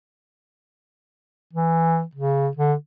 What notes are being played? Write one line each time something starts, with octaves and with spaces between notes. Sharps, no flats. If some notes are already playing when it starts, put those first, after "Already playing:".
E3
C#3
D3